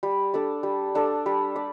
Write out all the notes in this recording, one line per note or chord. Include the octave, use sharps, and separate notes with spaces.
G3
D4 A4 D5
G3
D4 A4 D5
G3
D5